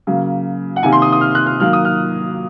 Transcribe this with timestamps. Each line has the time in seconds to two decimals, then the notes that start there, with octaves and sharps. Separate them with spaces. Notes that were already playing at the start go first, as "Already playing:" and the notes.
0.07 C#3 F#3 A#3
0.76 F#5
0.83 C3 D#3 A#3 G#5
0.92 C6
1.02 D#6
1.12 D#6
1.21 F6
1.35 F#6
1.47 F6
1.60 D#3 F#3 A#3 F6
1.73 D#6
1.85 F6